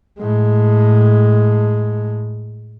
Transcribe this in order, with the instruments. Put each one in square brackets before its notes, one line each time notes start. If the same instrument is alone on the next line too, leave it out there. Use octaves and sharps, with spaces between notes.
[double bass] A2 G#3